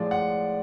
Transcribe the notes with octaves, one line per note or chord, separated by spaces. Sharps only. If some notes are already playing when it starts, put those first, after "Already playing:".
Already playing: A2 F3 G#3 D5
F#5